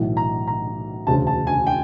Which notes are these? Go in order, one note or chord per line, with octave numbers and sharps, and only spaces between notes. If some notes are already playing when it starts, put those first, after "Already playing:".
Already playing: B1 A2 E3
A#5
A#5
E1 D2 C#3 A5
A5
G#5
G5